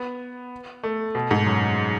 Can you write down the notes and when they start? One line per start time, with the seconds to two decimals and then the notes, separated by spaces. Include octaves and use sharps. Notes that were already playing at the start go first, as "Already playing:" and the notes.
Already playing: B3
0.83 A3
1.15 B2
1.31 G#2
1.46 F#2